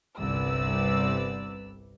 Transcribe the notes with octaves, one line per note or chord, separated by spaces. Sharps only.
G1 C2 C3 B4 D5 E6